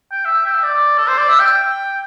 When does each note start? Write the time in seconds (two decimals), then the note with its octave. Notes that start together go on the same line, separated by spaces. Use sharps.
0.12 G5
0.25 E5
0.46 G5
0.55 E5
0.63 D5
0.98 A4
1.08 C5
1.18 D5
1.29 E5
1.39 G5